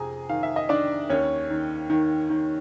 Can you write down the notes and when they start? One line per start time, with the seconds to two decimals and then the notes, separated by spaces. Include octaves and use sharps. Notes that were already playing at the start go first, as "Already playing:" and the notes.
Already playing: F2 C3 G#4 G#5 A#5
0.29 D#3 F5
0.43 E5
0.56 D#5
0.69 D#3 D4 D5
1.10 D#2 C#4 C#5
1.50 D#3
1.90 D#3
2.30 D#3